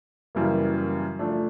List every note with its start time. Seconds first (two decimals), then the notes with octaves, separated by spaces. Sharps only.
0.35 F#2 C#3 E3 G3 A#3
1.19 F3 A3 D4